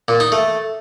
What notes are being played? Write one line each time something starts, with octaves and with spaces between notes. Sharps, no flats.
A#2
D#4
A3